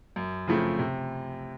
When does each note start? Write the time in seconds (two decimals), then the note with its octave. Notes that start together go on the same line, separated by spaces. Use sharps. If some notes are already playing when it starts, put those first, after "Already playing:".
0.16 F#2
0.47 C#3 F3 A3 C4
0.79 C3